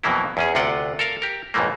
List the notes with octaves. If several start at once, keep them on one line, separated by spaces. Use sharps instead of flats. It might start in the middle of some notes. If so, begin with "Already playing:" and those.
F2 B2 E3 F#3 A#3 E4
E2 C#4 G#4
D2 C3 F4 F#5 G5
A4 A#4 F5
G4 A#4
B1 F2 G#2 E3 A3 A#3